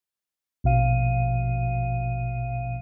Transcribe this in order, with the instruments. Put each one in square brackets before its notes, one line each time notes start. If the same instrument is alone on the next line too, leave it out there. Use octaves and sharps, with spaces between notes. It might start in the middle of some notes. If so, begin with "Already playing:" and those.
[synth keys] A#1 B2 F5 D#7